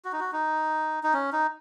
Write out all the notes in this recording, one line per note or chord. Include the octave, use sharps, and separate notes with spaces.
F#4
D#4
F#4
D#4
D#4
C#4
D#4